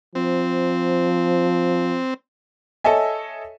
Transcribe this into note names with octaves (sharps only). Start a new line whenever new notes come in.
F3 C4
A4 C#5 D#5 E5 G#5